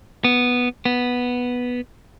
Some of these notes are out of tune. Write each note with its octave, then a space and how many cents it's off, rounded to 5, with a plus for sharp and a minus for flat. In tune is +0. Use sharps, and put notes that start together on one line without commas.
B3 -5
B3 -5